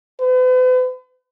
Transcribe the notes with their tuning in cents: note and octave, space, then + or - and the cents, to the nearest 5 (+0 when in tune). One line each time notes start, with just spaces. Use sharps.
B4 +45